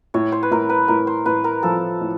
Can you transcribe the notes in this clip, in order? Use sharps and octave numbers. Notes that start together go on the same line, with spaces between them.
A2 C#5
C5
B4
A2 A#4
B4
A2 A#4
C5
A2 B4
A#4
F3 A4
A2